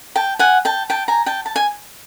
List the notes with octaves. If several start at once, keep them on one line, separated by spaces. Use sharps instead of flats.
G5 A5
F#5 G#5
G5 A5
G5 A5
G#5 A#5
G5 A5
A5
G#5